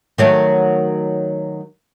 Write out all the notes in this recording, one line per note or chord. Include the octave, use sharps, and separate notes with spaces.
D#3 F#3 A3